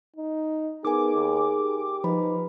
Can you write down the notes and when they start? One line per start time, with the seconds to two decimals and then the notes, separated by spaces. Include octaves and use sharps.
0.16 D#4
0.85 B3 D#4 G#4 A#4 G#5 D6
1.14 D#2
1.59 G4
2.04 F3 D#4 B4 B5